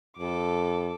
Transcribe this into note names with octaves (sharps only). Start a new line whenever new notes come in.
F2 A4 D6